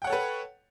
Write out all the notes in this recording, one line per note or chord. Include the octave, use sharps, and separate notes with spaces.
A4 B4 C#5 F#5 G5